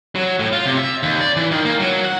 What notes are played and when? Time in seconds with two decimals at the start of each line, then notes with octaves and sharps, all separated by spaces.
0.15 F#3
0.39 A2
0.53 F4
0.66 C3
0.77 E5
1.03 D#2
1.21 D5
1.37 E3
1.51 D#3
1.65 A#3
1.80 F#3
2.05 F#5